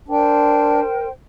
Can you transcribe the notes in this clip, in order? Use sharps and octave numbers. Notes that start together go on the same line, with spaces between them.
D4 A#4 C5 G5